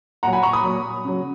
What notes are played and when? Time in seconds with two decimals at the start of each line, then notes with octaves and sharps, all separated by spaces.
0.23 A#2 F#3 F#5 A#5
0.33 G#5 B5
0.43 A#5 C#6
0.53 B5 D#6
0.64 A#2 F#3
1.05 C#3 F#3